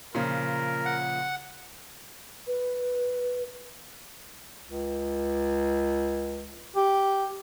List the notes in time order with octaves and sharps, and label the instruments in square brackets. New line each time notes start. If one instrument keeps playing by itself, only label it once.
[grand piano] A#2 C#3 F3 [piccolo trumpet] A#4
[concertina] F#5
[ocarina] B4
[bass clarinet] C#2
G4